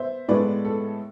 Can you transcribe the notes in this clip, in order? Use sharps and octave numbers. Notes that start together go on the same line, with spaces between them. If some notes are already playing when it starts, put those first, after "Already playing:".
Already playing: B3 C5 E5
A2 G#3 B3 B4 D5
A4